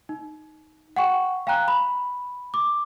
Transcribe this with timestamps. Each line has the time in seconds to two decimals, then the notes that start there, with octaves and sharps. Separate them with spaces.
0.09 D#4
0.96 F#5 G5 C#6
1.47 F5 G5 G#5 A#5 F#6
1.68 B5
2.54 D6